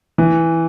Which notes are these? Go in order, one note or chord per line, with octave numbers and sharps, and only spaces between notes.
E3